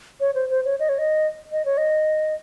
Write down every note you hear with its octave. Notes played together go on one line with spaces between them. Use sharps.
C#5
C5
C5
C#5
D#5
C#5
D#5
D#5
C#5
D#5